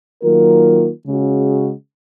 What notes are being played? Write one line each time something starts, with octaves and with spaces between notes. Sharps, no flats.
D#3 F#3 A#3 F4 A#4
C#3 G#3 C#4 F#4